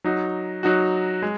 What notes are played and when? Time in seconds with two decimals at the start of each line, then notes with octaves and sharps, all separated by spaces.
0.04 F#3 D#4 F#4
0.63 F#3 D#4 F#4
1.22 G#3